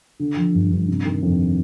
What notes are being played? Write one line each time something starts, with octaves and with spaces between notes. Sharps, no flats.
D3
F3
G2
G2
C3
D#3
F2